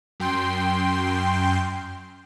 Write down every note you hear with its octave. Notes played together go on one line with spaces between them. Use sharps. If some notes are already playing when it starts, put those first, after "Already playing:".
F#2 G5 C6